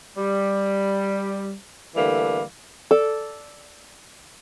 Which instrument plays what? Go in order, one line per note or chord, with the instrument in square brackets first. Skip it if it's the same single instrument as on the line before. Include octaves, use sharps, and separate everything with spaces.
[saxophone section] G3
D3 E3 G3 A3 A#3
[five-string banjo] A4 D5